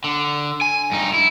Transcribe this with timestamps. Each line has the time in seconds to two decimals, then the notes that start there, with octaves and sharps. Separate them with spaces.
0.04 D3
0.61 G#5
0.92 G2 D#4
1.14 E4